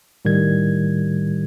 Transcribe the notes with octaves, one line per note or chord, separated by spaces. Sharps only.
A2 D#3 G3 G#6